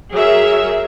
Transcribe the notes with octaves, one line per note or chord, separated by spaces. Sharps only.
F#3 G#4 A#4 E5